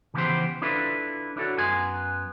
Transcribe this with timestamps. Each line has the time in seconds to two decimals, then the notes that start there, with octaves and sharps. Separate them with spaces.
0.14 C#3 E3 F3 B3 G4 C5
0.62 D4 E4 F4 A4 B4
1.37 D4 E4 F#4 A4 C#5
1.58 F#2 B3 G#5 C6